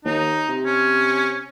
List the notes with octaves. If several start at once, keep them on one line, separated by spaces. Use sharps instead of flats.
D#2 D#4
C3
C#4